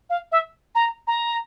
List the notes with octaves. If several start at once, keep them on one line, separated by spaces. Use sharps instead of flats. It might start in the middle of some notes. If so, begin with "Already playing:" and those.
F5
E5
A#5
A#5